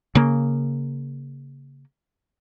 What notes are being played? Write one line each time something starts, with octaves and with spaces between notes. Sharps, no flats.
C#3 A#3